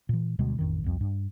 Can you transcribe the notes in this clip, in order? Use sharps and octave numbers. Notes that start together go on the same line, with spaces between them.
A#2 E3
D2 B2 G3 G#3
A1 F2 D#3
C2 F2
G2